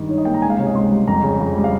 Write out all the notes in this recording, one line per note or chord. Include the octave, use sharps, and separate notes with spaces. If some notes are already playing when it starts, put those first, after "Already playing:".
Already playing: G2 D#3 G3
D#4 C#5
D#5
A#3 G5
A#5
C#2 G#5
F5
C3 C#5
D#5
C#2 C6
G3
F2 A#5
C#3
F2
G3
F5